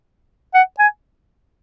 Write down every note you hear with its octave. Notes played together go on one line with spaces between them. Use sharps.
F#5
G#5